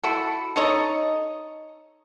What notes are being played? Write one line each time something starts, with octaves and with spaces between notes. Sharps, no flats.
E4 F#4 A4
D#4 A4 C#5 D#5